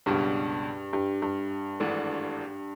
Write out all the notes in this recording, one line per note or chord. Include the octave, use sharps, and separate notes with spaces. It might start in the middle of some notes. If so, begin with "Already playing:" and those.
C#2 G2 B2 G3
G2
G2
G#1 G#2 E3 A3 D4